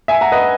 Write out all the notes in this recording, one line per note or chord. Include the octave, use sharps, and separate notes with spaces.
E5 G#5
F#5 A#5
B4 D#5